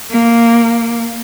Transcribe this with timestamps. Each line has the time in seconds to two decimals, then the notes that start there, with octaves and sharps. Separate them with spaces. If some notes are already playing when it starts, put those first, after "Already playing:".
0.11 A#3